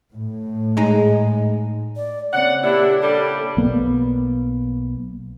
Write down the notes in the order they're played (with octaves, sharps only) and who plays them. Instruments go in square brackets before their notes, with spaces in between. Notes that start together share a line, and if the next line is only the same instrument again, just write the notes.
[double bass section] A2
[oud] G#3 D#4
[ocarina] D5
[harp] C#3 C4 [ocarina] D5 [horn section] F#5
[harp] A#2 [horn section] D4 E4 [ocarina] G4
[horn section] G3 D4 [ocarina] A4
[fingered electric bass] B1 A#3 B3